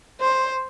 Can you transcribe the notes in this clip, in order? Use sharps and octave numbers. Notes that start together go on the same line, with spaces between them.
C5